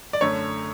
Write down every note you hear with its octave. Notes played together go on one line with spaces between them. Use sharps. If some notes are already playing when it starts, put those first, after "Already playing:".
D5
F#2 D3 A3 C#5